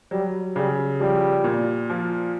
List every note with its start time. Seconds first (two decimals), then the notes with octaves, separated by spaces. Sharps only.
0.11 F#3 G3
0.55 C#3 G3
1.00 F3 G3
1.44 A#2
1.90 F3